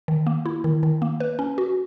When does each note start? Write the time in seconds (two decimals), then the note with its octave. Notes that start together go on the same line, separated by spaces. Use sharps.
0.08 D#3
0.27 A#3
0.46 E4
0.64 D#3
0.83 D#3
1.02 A#3
1.20 B4
1.39 C#4
1.58 F#4